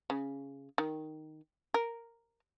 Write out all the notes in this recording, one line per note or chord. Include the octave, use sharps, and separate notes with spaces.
C#3
D#3
A#4